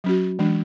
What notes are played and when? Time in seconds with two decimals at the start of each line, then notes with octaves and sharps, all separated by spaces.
0.04 F#3 C#4 F#4
0.39 E3 G#3 D4